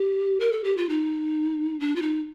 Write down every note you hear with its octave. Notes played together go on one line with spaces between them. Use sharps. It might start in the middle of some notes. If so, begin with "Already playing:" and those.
Already playing: G4
A#4
A4
G4
F4
D#4
D4
F4
D#4